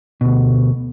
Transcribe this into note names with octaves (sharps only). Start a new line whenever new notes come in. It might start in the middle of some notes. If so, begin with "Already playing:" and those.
D2 B2